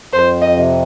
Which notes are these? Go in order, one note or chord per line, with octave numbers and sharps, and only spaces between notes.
F2 C5
D#5
C3